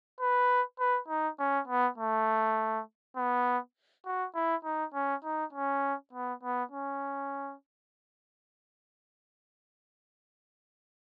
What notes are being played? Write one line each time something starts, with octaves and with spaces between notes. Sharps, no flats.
B4
B4
D#4
C#4
B3
A3
B3
F#4
E4
D#4
C#4
D#4
C#4
B3
B3
C#4